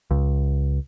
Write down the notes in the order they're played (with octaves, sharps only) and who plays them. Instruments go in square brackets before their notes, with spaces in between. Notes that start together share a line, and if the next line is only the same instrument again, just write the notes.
[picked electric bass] C#2